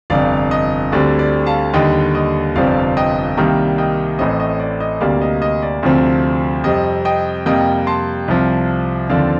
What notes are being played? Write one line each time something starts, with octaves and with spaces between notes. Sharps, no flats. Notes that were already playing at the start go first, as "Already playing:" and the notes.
G1 F2 C3 D5 F5
D#5
D2 D3 G3 C4 D5
D5
F5 A5
D#2 D3 G3 D#5 G5
D#5
G1 F2 C3 F3 C4 D5 F5
D#5 G5
C2 C3 D#3 G3 A#3 G5 A#5
D#5 G5
A1 A2 A3 C4 D#5
D#5
D5
D#5
D2 C3 G3 A#3 D5 F5
D#5
D#5
D5
D2 C3 F3 C4
F2 C3 G3 C4 D#5
D#5 G5
F2 C3 G3 A#3 D#5 G5
A5 C6
C2 C3 F3
D#2 D3 F3 C4 D5 F5